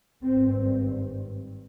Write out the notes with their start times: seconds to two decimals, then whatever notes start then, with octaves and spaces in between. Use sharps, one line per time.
0.23 G#1 G2 C4
0.53 C4